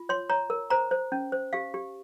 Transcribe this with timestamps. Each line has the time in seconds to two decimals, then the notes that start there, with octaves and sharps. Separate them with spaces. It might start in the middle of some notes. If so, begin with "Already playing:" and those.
Already playing: F4
0.09 C#5 C6
0.29 C#5 A#5
0.50 A#4
0.70 C5 A#5
0.91 C5
1.12 C#4
1.32 C5
1.53 G4 F5
1.74 G4